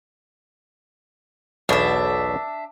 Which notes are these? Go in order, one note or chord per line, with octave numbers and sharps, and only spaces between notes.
B1 E2 B2 D4 E5